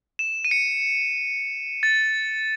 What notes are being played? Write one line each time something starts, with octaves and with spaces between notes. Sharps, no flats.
E7
D#7
C#7
A6